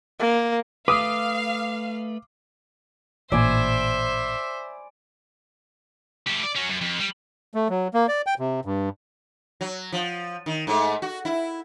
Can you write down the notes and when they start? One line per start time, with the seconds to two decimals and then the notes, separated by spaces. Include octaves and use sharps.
0.20 A#3
0.88 A3 B4 F5 D6 D#6
3.32 A1 A#2 C5 D5 E5 G#5 B5
6.27 A3 G4
6.43 D5
6.56 C#4 F#4
6.69 F#2
6.81 F2
6.99 G3
7.55 A3
7.70 F#3
7.94 A#3
8.08 D5
8.27 G5
8.39 C3
8.65 G2
9.61 F#3
9.92 F3
10.46 D#3
10.67 G#2 A3
11.02 F#4
11.25 E4